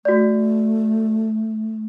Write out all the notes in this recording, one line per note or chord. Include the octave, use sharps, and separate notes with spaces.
A3 F#4 D5